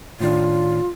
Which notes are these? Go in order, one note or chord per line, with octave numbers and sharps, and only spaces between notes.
A2 D#3 D4 F4